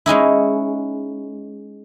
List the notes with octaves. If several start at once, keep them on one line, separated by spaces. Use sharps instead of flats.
G#3 C#4 D#4 E4